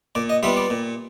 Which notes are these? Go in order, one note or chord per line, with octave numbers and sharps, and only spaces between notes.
A#2 D5
D#5
G3 B3 D4 F4 E5
D5
A#2